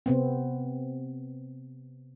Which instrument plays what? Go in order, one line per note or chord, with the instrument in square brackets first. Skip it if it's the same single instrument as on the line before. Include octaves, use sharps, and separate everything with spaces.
[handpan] C3 B3 C4